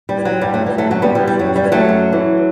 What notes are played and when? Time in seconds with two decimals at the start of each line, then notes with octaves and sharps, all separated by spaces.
0.09 G3
0.17 E3
0.25 F#3
0.41 G2 G3
0.54 F#3 A3
0.66 E3 G3
0.78 F#3 A3
0.90 F#2 F#3 A3
1.02 G3 B3
1.15 E3 G3
1.27 G3
1.39 F#2 F#3
1.56 G3
1.64 E3
1.72 F#3 A3
1.89 F#2
2.13 E3